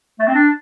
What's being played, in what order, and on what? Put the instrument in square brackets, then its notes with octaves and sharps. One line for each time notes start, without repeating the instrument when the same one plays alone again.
[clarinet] A3
C4
D4